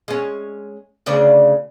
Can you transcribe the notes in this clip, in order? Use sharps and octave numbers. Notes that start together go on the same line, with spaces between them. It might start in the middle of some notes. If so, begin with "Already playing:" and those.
G#3 C#4
D2 C#3 D4